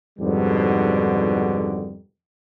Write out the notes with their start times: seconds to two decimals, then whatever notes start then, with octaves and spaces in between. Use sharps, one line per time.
0.19 F2 G#2 B2 D3 D#3 G3